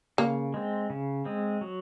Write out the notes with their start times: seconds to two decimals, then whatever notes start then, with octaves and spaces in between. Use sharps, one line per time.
0.18 C#3 A#3
0.54 G#3 C4
0.90 C#3
1.25 G#3 C4
1.61 F#3